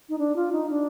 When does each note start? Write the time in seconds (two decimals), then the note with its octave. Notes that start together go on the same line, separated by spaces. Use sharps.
0.09 D#4
0.18 D4
0.36 F4
0.52 D#4
0.70 D4